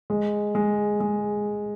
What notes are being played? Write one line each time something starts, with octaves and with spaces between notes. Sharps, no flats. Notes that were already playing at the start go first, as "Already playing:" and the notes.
G#3
G#3
G#3